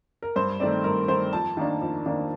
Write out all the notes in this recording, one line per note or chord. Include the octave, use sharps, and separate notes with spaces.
A#4
G2 C5
D#3 A3 C4 D5
G2 A#4
D#3 A3 C4 C5
F2 A5
D#3 A#3 D4
F2
D#3 A#3 D4